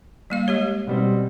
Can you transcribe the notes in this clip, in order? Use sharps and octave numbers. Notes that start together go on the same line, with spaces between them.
G3 A#3 F5
G#3 G4 C#5
B2 G3 C4